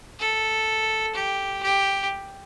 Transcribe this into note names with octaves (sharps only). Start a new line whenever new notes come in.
A4
G4
G4